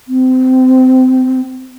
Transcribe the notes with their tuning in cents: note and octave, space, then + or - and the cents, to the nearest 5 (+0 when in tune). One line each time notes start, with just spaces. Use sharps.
C4 -25